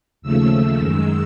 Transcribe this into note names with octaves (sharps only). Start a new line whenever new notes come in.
D#2 C#3 F3 A3 E6
F#2 D#3 G#3